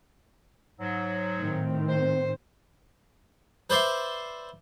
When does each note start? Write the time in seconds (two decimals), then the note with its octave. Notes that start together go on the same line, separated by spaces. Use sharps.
0.80 G#2 F#3
1.38 A2 D#3 C4
1.88 C5
3.70 B4 C5 D5 E5 C6